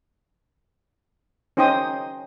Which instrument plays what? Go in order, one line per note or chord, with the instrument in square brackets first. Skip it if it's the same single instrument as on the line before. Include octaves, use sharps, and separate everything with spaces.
[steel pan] C#4 D#4 C5 G5 C6 D#6